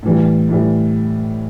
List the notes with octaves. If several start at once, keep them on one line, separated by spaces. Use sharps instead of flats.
A2 E3 G3
A2 E3 G3